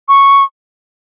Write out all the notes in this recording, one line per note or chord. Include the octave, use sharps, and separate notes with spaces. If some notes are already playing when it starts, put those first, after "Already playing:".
C#6